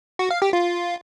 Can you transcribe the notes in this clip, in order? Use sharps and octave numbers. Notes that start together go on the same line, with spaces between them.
F#4
F5
G4
F4